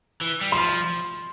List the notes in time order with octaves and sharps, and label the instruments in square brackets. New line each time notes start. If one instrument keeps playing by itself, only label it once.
[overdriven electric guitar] E3
G3
[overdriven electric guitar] F3 [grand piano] C6